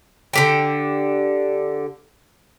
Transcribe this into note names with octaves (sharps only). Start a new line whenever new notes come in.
D3 G4 G5